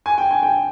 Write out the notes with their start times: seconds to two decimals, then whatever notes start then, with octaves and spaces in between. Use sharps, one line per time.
0.06 G#5
0.18 G5
0.31 G#5
0.43 G5